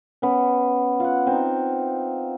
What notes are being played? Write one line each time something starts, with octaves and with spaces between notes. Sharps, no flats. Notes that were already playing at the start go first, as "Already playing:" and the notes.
B3 C#4
F4 F#5
C4 D#4